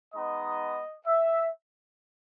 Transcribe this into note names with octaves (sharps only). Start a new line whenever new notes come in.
G#3 B3 D#4 D#5
E5